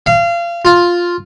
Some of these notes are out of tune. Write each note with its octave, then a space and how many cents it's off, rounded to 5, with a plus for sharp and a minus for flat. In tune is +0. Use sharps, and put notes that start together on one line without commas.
F5 -30
F4 +5